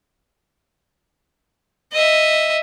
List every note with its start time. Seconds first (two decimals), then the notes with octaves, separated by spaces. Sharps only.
1.93 D#5 E5